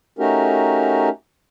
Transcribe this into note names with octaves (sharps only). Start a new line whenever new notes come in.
A3 C#4 D#4 F#4 G4 A#4